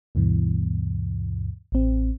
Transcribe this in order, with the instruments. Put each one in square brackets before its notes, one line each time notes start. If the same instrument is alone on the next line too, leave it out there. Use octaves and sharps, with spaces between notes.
[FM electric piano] D2 G2 B2 E3
A1 C4